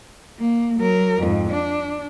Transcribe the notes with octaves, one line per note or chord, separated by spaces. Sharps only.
A#3
F#3 A#4
F2 G#2
D4